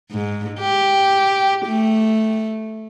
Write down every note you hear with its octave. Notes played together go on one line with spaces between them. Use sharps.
G#2
G4
A3